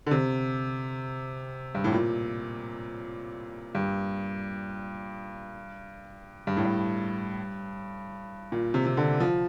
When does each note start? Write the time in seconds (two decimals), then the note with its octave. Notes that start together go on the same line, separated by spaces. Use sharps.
0.07 D3
0.11 C3
1.75 G2
1.84 A2
1.92 A#2
3.75 G2
6.47 G2
6.57 A2
6.65 G2
8.52 A#2
8.74 C3
8.86 C3
8.97 D3
9.20 F3